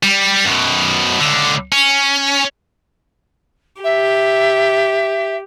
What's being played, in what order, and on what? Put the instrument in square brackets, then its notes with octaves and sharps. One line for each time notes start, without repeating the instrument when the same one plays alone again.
[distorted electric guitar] G3
F#2 B2
C#2 D3
C#4
[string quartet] G4 [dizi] E5